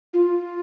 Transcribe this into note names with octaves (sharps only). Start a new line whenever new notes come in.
F4